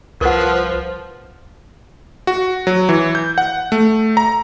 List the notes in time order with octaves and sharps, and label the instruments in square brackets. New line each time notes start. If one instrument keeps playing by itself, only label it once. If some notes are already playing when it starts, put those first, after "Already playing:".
[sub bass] C2 [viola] F3 [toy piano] A#4 F#5 [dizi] B4
[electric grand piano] F#4
F#3
E3
G6
F#5
A3
A#5